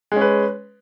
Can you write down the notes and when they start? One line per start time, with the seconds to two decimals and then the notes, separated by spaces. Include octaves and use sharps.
0.12 G#3
0.16 C#4
0.21 B4